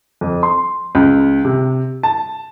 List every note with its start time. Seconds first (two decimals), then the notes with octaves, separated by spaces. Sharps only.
0.21 F2
0.43 C6
0.95 C#2
1.45 C3
2.03 A5